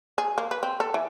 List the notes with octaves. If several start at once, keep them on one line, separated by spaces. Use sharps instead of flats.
G#4
A#3
B4
C4
A4
E3